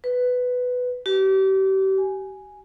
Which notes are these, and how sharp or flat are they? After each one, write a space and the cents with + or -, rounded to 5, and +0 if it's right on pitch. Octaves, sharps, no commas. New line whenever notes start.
B4 +10
G4 -35
G#5 +0